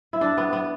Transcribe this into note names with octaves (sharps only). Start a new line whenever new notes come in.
E4
D4
B3
B3